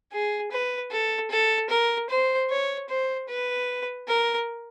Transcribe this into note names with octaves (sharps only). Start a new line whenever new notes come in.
G#4
B4
A4
A4
A#4
C5
C#5
C5
B4
A#4